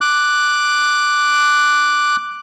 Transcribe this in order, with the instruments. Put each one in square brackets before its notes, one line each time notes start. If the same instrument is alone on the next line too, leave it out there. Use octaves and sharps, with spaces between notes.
[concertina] D6 F#6